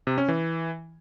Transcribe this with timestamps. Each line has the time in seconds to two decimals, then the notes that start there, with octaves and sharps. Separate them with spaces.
0.07 C3
0.18 C#4
0.28 E3